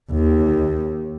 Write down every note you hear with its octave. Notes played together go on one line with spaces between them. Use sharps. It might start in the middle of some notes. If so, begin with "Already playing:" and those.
D#2